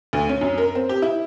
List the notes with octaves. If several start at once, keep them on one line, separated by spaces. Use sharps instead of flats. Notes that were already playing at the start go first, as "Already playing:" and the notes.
D2
C#4
F#2
A#4
C4
G4
E4